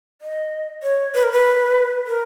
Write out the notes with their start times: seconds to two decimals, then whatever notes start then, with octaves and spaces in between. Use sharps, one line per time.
0.22 D#5
0.83 C#5
1.15 B4
1.23 A#4
1.32 B4
2.07 A#4